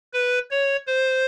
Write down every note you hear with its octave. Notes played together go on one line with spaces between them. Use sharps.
B4
C#5
C5